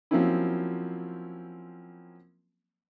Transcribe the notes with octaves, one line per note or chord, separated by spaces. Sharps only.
F3 F#3 A#3 C4 C#4 E4